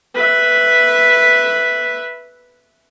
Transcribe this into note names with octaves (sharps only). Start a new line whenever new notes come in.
B4 E5